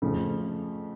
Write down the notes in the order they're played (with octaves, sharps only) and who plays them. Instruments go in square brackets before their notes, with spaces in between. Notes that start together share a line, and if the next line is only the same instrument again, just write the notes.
[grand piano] F2 C#3 F3 A3